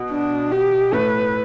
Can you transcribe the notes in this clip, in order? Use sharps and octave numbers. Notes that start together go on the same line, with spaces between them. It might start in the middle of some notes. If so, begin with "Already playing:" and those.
Already playing: B2
D4
G4
A2 A3 B4